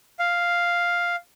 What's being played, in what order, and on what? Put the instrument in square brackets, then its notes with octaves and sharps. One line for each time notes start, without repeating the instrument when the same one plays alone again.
[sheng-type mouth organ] F5